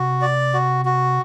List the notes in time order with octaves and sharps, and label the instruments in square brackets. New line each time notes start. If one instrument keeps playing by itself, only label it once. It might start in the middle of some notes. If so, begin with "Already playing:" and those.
Already playing: [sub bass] C3 [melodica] F#4
[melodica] D5
F#4
F#4